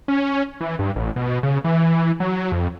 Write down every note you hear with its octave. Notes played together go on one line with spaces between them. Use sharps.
C#4
E3
G2
A1
B2
C#3
E3
F#3
F2